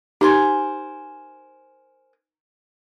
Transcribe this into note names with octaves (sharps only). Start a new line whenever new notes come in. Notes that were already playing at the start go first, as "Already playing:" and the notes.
D#4 G4 A#4 C5 G#5